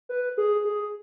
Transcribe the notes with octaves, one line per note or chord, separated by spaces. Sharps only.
B4
G#4
G#4